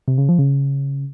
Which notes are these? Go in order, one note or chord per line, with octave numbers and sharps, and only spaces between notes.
C3
C#3
F3
C#3